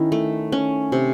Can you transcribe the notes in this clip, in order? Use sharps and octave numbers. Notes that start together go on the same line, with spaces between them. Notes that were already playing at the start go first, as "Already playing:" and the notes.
Already playing: D#3 C#4 E4
A3
C#4
C3